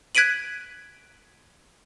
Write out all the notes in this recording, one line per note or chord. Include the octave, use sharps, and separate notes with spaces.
F#6 G#6 B6 D7 D#7 F#7